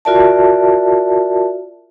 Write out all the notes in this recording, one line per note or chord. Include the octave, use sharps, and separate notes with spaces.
F4 F#4 A#4 D5 E5 A5